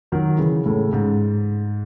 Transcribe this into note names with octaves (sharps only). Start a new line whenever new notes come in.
D#3 F#3
C#3 E3
A2 C#3
G#2